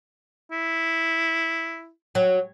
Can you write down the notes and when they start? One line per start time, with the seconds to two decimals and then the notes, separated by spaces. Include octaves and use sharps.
0.51 E4
2.15 F#3